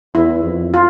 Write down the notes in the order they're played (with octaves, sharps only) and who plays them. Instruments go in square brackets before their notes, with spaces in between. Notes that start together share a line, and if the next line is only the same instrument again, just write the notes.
[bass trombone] E2 [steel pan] E4
[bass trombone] F2
[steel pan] F4